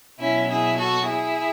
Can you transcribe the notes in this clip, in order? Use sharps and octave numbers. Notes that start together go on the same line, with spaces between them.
B2 F#3 C#4 E4
E4 G#4
F#4 A4
E4 G#4